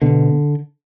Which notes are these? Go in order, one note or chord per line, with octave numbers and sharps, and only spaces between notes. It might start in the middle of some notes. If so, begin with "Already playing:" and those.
B2 D3